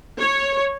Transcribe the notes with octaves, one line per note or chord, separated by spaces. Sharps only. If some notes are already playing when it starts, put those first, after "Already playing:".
C#5